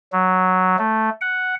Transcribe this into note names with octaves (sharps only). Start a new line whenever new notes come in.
F#3
A3
F#5